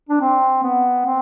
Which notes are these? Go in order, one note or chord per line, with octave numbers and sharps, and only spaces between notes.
D4
C4
B3
C4